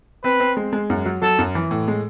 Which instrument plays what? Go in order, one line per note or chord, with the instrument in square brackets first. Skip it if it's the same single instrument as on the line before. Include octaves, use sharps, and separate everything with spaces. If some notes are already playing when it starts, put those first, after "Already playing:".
[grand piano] C4 [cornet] B4
[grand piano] C4
G#3
G#3
F#2
F#3
[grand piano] F#3 [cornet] A4
[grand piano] F#2
E3
A2
G#3